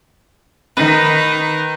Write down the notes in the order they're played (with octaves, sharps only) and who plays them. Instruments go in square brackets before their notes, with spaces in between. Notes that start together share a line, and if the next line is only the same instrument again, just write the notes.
[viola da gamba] D#3 [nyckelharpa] D#4 [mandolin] B4